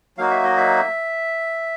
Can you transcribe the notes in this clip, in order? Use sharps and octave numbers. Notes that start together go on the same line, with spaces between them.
F#3 A#3 D#4 F#4 F5
E5
D#5
E5